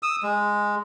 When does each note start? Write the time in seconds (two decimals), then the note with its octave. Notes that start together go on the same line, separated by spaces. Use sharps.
0.03 D#6 E6
0.23 G#3